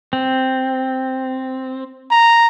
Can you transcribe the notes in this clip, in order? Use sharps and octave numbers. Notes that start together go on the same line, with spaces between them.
C4
A#5